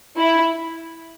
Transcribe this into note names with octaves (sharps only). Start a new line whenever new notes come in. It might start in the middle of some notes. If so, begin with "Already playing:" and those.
E4